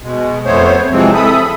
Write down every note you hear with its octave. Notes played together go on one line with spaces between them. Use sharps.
B2 G#3
F2 A3 B3 C5 C#5
C3 E3 F3 G#3 C4
A4 E5 B5 D#6